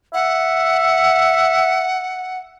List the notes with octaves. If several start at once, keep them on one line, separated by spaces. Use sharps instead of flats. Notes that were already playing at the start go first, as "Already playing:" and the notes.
E5 F#5